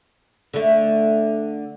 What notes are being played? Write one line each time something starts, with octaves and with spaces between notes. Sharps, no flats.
D3 A3